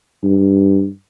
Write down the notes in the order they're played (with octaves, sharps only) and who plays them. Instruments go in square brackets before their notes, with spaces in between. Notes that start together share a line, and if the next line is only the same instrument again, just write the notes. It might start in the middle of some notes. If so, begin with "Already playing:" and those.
[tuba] G2